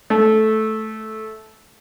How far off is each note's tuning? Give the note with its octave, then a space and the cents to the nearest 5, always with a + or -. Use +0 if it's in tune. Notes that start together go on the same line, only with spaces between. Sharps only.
A3 -10